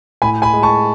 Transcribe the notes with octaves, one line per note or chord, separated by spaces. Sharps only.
A2 G#5 B5
G#5 B5
G#3
A5 C#6